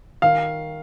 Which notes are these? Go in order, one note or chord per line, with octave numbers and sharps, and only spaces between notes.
D#3 F5